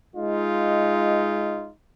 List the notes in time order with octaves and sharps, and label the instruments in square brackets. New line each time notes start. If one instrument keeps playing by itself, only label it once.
[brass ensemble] G#3 D#4 F4